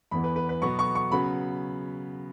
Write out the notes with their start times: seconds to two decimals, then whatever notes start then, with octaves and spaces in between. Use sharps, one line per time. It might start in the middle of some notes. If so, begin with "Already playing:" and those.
0.11 E2 E3 B3 B5
0.24 B4
0.36 B4
0.49 B4
0.62 B2 F#3 B3 C#6
0.79 C#6
0.95 C#6
1.12 C#3 F#3 B3 B5